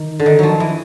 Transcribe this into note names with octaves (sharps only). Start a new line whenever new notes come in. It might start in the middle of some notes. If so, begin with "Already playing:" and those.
Already playing: D#3
D3
D#3
F3 F#3
E3